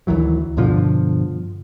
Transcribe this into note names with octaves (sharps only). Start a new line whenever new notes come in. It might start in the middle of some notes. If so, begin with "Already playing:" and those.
D2 D#3 E3 F#3
G2 B2 D3 F3